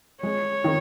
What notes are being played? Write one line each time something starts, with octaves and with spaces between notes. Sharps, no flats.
G#3 C#5
D#3